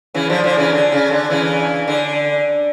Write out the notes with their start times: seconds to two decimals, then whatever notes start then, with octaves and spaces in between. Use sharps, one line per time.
0.14 C#3 E3
0.30 D3 F3
0.44 D3 F3
0.57 C#3 E3
0.73 D3
0.92 C#3
1.11 D3
1.30 C#3 E3
1.88 D3